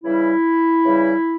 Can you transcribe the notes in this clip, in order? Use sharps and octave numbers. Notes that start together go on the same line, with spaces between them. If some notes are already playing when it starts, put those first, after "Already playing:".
C#3 E3 G3 E4
C#3 E3 G3